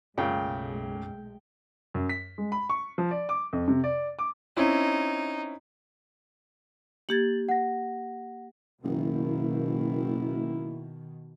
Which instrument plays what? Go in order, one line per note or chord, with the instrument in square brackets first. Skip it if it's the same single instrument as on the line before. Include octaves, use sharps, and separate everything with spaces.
[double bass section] B1 G#3 A3 [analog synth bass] F#2 [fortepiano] A#2 C#3 [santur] G5
[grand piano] F#2
B6
G#3
B5
C#6
F3
D5
D6
F2
C3
D5
D6
[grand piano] C4 C#4 E4 [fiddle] D#4
[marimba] A#3 G4 G#6 [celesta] A6 F#7
[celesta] F#5 A#6
[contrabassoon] F#1 [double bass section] B2 D#3 [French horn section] A#3 E4